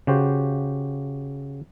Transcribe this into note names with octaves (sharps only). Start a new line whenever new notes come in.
C#3 F#4 G4 C5